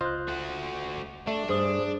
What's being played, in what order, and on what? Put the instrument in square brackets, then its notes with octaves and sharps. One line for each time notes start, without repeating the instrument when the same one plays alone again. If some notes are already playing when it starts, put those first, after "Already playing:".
[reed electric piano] C#2 F#6 [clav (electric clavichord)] F4 C5 D#5
[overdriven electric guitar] A3 F#4
[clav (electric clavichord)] A3 [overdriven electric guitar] D4
[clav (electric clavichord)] G2 [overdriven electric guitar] D4 [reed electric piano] G#4 C5 D#6